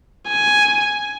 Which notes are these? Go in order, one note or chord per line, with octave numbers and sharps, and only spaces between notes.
G#5